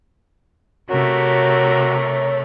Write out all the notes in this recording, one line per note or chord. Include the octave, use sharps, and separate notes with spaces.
C3 A3 F#4 A#4 C#5